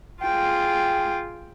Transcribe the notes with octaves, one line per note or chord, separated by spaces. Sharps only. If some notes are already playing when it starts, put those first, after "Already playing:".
F4 G#4 G5